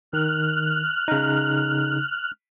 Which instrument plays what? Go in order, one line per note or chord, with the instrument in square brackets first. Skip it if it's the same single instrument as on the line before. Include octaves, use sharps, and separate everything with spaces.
[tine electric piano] D#3 [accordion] F6 F#6
[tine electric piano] C#3 D#4